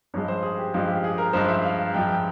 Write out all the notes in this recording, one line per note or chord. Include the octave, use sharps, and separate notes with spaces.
G2 F3 G#3 C#5
C5
G#4
G4
G2 F3 G#3 F4
G4
G#4
A#4
G2 F3 G#3 C5
E5
F5
G2 F3 G#3 G5
G5